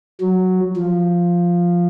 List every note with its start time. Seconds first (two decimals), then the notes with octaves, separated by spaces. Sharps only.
0.21 F#3
0.76 F3